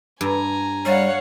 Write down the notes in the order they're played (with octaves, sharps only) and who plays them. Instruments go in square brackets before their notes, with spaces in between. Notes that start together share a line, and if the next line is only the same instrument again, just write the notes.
[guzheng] G2 [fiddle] G#5 A#5
[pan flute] G3 [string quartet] C#5 F5 F#5